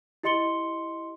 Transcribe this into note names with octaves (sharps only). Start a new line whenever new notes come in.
E4 G4 D#5 C6 C#7 G7